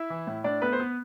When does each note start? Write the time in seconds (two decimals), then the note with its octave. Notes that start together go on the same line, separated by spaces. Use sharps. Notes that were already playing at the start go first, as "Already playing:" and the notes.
Already playing: E4 E5
0.10 E3
0.27 A2
0.44 A2 D4 D5
0.62 A3 B3 B4
0.73 C5
0.80 B3 B4